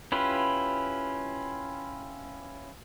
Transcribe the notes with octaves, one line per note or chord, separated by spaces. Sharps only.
C#4 E4 F4 G4 B4